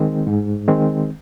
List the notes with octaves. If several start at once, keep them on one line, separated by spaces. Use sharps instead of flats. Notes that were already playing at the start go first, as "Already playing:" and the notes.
Already playing: D#3 G#3 C4
G#2
D#3 G#3 C4